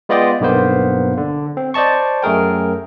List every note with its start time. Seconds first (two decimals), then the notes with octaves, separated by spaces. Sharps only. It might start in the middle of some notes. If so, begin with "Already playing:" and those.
0.09 G#3 B3 F4 D5 D#5 G5
0.40 B1 G2 A#3 B3 C5
1.17 D3
1.57 C4
1.74 C5 D5 D#5 A5 C#6
2.22 F#2 A3 G#4 A#4 G5